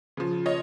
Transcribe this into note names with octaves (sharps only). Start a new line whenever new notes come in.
C#3 F3
C#5 D#5